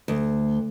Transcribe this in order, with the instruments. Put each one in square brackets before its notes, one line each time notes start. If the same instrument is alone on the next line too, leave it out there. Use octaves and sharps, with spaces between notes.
[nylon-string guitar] D2